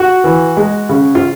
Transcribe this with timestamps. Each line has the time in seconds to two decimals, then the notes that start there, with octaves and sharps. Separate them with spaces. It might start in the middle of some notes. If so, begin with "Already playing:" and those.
Already playing: F#4
0.24 E3
0.57 G#3
0.89 C#3
1.15 F4